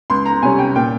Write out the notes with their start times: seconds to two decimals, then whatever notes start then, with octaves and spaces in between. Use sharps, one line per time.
0.10 C#2 C6
0.26 A#5
0.42 C3 G3 C#4 G#5
0.58 G5
0.75 A#2 G5